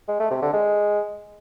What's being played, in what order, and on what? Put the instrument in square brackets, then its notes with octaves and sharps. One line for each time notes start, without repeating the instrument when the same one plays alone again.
[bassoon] G#3
A3
C3
D3
G#3